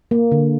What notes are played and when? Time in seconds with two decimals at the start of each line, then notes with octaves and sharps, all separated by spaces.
0.11 A#3
0.32 D3